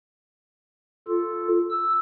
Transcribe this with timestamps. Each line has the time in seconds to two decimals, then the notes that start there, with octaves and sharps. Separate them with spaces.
1.08 F4 A4
1.71 E6